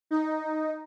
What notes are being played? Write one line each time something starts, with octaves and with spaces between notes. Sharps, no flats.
D#4